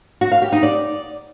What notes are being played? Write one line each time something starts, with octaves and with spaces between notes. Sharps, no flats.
F#4
F5
G4
D#4
D5